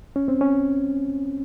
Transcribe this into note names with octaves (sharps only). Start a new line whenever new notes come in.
C#4
C4
C#4